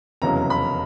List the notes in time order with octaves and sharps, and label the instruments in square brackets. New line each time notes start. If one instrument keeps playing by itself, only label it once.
[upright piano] F1 E2 C#3 F#3 A#3 A#5
B5